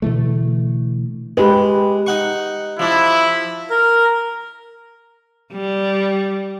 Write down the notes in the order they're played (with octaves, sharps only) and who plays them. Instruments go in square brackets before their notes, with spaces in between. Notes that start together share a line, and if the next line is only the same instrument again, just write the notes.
[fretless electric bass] B2 D3 E3 A3
[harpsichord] G#3 [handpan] G4 B4
[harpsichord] D#4 F#5 C#6
[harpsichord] F3 D4 [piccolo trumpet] E4
[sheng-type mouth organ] A#4
[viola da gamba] G3